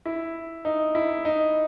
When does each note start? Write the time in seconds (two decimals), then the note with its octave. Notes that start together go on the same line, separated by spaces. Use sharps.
0.06 E4
0.65 D#4
0.95 E4
1.25 D#4